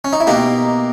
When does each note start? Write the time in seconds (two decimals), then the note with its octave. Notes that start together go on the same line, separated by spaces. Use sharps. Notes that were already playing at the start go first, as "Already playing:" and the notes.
0.05 C#4
0.13 D#4
0.20 E4
0.27 B2 A#3 D#4 G4